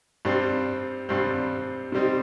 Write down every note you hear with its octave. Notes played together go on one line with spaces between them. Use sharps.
G2 G3 C4
G2 G3 C4
C3 G3 C4 D#4